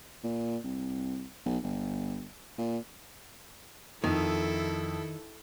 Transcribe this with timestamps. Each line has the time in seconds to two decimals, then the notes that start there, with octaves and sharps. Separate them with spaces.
0.24 A#2
0.64 C2
1.46 B1
1.63 G1
2.58 A#2
4.04 F2 D#3 E4 A4